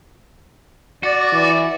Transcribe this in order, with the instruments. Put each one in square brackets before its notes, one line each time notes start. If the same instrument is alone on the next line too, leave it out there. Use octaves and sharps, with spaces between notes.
[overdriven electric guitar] F#4 [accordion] D5
[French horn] E3